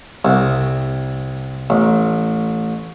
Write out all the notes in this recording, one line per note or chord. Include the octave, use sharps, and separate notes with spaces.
C2
A1